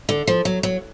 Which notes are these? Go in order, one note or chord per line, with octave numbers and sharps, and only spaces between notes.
D3
F3
F#3
F#3